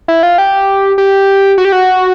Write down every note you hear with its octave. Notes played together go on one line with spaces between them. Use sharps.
E4
F4
G4
G4
F#4
G4
F#4